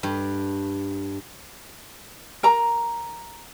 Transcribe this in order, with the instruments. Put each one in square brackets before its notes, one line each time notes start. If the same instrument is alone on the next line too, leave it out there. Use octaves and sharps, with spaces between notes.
[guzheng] G2
[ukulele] A#4 A#5